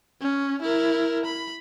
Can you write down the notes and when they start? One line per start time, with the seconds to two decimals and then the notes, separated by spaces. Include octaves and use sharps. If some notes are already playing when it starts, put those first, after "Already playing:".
0.21 C#4
0.62 E4 A#4
1.25 B5